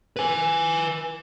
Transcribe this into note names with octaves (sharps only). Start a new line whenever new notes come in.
B4 G#5